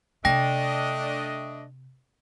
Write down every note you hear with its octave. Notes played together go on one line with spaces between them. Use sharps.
C3 A3 D4 D#5 G5 A#6